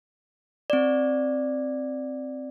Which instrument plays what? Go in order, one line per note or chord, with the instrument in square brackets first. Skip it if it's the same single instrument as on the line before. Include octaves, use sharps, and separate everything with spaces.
[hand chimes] C4 D5